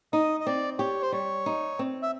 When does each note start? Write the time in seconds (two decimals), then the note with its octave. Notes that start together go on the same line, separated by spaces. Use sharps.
0.13 D#4 D#5
0.41 D#5
0.46 C4 D5
0.79 G4 C#5
1.02 C5
1.12 G3 C#5
1.46 D#4
1.79 C4
2.02 E5